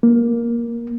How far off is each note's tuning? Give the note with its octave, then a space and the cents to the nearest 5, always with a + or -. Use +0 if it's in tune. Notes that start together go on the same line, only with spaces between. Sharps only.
A#3 +10